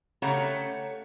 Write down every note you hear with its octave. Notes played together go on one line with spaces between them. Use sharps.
C#3 A3 G4 C#5 F#5 A#5